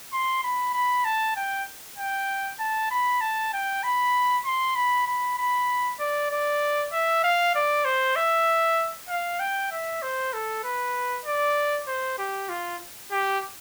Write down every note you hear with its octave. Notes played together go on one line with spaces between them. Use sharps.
C6
B5
B5
A5
G5
G5
A5
B5
A5
G5
B5
C6
B5
B5
B5
D5
D5
E5
F5
D5
C5
E5
F5
G5
E5
C5
A4
B4
D5
C5
G4
F4
G4